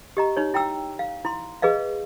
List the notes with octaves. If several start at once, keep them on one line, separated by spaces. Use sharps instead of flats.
G4 D#5 A#5
D#4 C#5
E4 G5 A#5 E6
F5
E4 C6
G#4 B4 D#5 F5